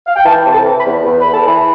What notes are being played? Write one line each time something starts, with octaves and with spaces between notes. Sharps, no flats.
F5
G5
E3 A5
C3
A5
E3
B5
E2
E2
B5
E2
A5
E3 B5